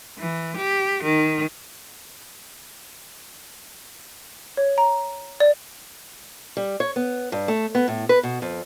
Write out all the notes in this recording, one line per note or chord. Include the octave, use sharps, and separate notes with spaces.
E3
G4
D#3
C#5
A#5
D5
G3
C#5
B3
G2
A3
B3
A2
B4
B2
F2